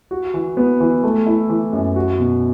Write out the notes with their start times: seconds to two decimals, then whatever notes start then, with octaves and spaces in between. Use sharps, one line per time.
0.11 F#4
0.34 E3
0.57 B3
0.80 E3
1.03 A3
1.26 E4
1.49 E3
1.73 F#2
1.96 F#4
2.19 B2